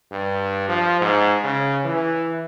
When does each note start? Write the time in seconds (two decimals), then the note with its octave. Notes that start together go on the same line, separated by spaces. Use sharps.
0.12 G2
0.68 F3
1.01 G#2
1.44 C#3
1.85 E3